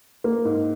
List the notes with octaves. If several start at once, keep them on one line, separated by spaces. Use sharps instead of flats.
A#3
G#2